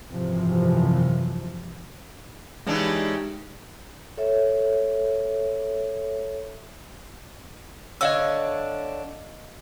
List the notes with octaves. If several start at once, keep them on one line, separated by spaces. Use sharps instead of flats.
G#1 F#2 C3 E3 F3
C#3 E3 G#3 D4 D#4 G4
A4 C#5 E5
D3 D4 C#5 D#5 F5 E6